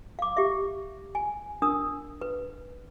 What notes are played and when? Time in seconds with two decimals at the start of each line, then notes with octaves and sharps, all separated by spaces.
0.19 F5 D6
0.37 G4 E5
1.15 G#5
1.62 D4 A#4 D#6
2.21 B4